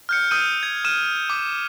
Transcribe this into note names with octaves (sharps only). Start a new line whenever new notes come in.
F6 G6 C#7
D#6 E6 G6 D#7
G#6
F6 D#7 E7
D6